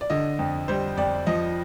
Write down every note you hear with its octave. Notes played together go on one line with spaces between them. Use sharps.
D5
D3 D#5
F2
G3 C5
F2 D5
F3 D#5